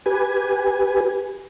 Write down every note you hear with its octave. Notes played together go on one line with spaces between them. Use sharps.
G4 B4 G#5